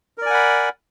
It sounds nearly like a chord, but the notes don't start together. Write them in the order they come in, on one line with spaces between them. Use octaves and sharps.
A#4 D5 G#5 F#5 B5